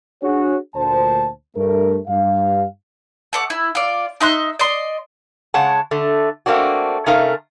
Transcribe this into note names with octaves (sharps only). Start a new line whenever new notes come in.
D4 F#4 G#4 C#5
D2 A#2 C5 A5
G2 A3 A#4
G2 F5
A3 F#5 D6
E4
F4 D5
D#4 E5 C6 F#6
D5 D#5 C6
C#3 G#3 C#5 F#5 A5
D3 A3
A3 A#3 C4 D4 F#4
C3 A3 C#4 D#4 A#4 F5